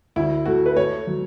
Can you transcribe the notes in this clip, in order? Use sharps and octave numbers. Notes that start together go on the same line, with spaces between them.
D2 E4
A3 F#4
B4
A3 C#5
F#3